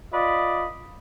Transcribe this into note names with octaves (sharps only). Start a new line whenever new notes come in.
F4 B4 D5 D#5